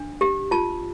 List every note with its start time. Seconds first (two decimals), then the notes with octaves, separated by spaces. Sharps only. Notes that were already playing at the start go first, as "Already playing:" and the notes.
Already playing: D4
0.21 G4
0.51 F4 A5